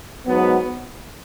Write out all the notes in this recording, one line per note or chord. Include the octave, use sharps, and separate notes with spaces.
G#2 F#3 B3